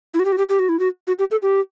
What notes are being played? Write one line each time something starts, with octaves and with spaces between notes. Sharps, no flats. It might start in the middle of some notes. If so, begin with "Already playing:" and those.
E4
F#4
G4
F#4
G4
G4
F#4
E4
F#4
F#4
G4
A4
G4